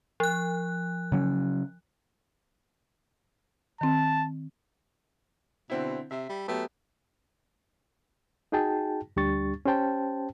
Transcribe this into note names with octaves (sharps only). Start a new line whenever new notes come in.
F3 F#6
C#3 F#3 C#4
D#3 C4 A5
B2 D3 C4 E4
C3 E5
G3
F#3 A3 B3 G4
D#4 F#4 G#4 G5 A5
D2 G3 D4 G4 C#6 A6
C#4 G4 C5 G5 A5